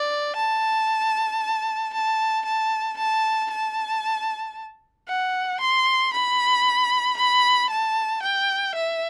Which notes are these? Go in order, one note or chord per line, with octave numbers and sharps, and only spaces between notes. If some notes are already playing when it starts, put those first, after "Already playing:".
Already playing: D5
A5
A5
A5
A5
A5
F#5
C6
B5
B5
A5
G5
E5